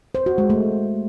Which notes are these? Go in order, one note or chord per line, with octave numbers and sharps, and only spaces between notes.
C5
F#4
G#3
A3